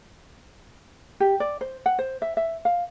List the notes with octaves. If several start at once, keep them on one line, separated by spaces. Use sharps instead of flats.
G4
D5
C5
F#5
C5
E5
E5
F5